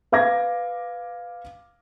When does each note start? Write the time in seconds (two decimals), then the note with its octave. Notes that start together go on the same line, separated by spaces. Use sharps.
0.12 B4 F5 D6 G#6 A#6